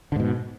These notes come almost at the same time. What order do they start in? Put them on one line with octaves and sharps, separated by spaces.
D3 G#2 B2